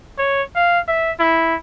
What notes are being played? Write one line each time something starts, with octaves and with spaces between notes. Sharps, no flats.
C#5
F5
E5
E4